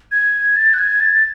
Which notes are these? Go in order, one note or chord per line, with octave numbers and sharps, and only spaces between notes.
G#6
A6
F#6
G#6
A6